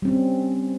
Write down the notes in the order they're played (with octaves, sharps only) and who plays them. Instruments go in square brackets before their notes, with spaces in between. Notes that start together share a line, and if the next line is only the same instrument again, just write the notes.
[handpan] G3
C4
C#4